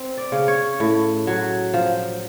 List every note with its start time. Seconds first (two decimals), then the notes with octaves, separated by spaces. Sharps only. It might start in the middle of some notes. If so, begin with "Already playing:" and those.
Already playing: C4
0.17 D5
0.32 C#3
0.48 C#5
0.80 A2
1.27 F#3
1.74 F3